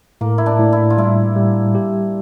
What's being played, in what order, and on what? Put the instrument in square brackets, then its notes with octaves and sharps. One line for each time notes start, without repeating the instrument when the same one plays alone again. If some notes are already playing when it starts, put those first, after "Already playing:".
[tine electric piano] A2 [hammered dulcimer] A#3
[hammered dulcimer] E4
D4
[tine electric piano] A2
[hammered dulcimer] E4
F4
[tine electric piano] G3 [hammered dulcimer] E4
[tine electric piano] G3
G4